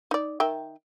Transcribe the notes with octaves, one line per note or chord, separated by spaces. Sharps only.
D#4 D5
D#3 E5 G5